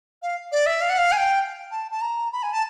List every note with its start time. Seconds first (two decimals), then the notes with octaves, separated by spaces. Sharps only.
0.22 F5
0.52 D5
0.66 E5
0.81 F5
0.89 F#5
0.98 F5
1.12 G#5
1.17 G5
1.71 A5
1.91 A5
2.01 A#5
2.32 B5
2.43 G#5
2.53 A5